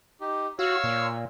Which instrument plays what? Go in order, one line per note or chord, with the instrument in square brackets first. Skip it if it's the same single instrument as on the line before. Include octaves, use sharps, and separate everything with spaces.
[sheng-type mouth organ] D#4 G4
[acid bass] F#4 [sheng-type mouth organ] C#5 F5 E6
[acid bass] A#2